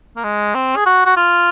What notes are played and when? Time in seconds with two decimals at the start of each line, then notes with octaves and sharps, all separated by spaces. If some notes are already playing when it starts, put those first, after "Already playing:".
0.16 A#3
0.24 G#3
0.54 C4
0.76 G#4
0.86 F#4
1.06 F#4
1.17 F4